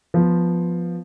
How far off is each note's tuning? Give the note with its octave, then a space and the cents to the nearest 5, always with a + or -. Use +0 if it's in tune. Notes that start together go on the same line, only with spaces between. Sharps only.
F3 +0 B3 +0